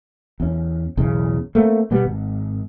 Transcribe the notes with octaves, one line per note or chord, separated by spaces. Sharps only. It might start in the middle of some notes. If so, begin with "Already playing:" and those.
E2 C#4
B1 E2 C#3
A3 A#3 C4
B2 G3 B3
G#1